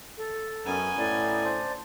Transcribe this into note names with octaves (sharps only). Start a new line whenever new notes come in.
A4
F#2 B3 C#4 D#4 G#5
A2 D5
D4 C5